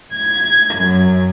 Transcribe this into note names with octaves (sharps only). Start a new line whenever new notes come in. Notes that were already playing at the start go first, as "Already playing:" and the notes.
G#6
F#2